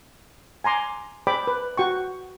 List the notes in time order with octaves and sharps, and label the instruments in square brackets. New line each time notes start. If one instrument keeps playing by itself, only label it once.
[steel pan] G#5 A#5 C6 D6
G#4 C5 D5 G5 B5 D6
B4
F#4 G5 C#6